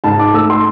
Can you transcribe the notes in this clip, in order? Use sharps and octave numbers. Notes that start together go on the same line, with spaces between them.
G#2 A5
D6
A3 E6
C6